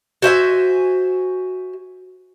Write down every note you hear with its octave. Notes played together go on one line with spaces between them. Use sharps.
F#4 C5 E5 G#5